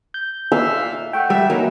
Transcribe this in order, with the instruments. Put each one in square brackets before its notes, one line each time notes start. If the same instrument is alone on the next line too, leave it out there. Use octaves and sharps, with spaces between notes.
[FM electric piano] G6
[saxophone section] A#2 E5 F5 [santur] E6
[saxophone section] A3 C#5 [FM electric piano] F#5 G5
[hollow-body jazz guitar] G3 [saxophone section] E5
[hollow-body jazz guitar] E3 F#3 A#3 [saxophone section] D#4